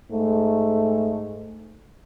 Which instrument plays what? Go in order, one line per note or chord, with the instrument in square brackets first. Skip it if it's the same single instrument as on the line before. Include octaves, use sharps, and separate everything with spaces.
[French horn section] G#2 A3